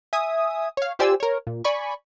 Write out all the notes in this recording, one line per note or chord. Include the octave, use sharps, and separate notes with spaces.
E5 G#5 D#6
C#5 F5
F4 G4 C5 D5 G#5 E6
A#4 C#5
A#2
D5 G#5 B5 C#6